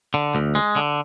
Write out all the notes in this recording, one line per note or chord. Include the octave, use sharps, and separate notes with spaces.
D3
D2
G#3
D3